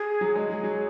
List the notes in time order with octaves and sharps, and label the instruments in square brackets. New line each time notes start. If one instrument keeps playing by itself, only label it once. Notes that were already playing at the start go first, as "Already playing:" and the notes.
Already playing: [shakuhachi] G#4
[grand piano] F#3
G#3
[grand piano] F#3 [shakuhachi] G#4
[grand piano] F#3